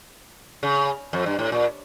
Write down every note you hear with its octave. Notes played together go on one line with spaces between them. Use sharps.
C#3
F2
G2
A2
A#2